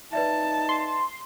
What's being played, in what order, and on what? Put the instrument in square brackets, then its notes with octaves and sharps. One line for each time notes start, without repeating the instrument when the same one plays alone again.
[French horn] D#4 [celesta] B4 D5 E5 [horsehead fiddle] A5
[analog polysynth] C6